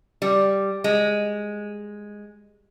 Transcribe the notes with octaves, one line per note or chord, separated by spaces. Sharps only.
G3
G#3